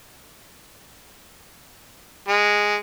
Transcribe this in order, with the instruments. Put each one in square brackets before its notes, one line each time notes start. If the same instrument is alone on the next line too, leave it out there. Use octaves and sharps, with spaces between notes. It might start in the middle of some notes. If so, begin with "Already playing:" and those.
[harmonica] G#3